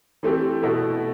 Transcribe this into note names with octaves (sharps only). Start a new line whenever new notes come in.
E3 A3 C4 G4
B2 A3 E4